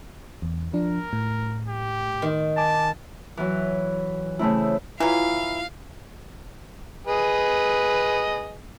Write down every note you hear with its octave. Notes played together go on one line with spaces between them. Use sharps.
E2
F3 D4 A#4
A2
G4
D#3
G#5 A5 D6
E3 F#3
C#3 A3 C4 E4
E3 F#3 E4 F4 F5
G#4 B4 D#5